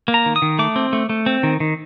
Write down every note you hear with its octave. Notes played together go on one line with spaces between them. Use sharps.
A#3
A#5
D#3
D#6
D#3
A3 D6
C4
A3
A3
C4
D#3
D#3